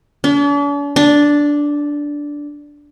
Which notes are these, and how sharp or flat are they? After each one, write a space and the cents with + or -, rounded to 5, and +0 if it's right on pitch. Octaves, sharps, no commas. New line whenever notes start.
D4 -45
D4 -5